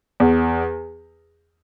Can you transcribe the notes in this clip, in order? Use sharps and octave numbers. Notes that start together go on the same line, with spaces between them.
E2